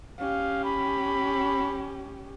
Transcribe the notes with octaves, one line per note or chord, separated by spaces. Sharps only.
C#4 G4 F5
B5